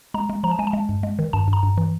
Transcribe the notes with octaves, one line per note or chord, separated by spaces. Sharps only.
G#3 A#5
G#3
F3 A#5
A5
G#3 G#5
A5
G#3
G2
G#3
D#3
G2 A5
G2
A#5
G2
E3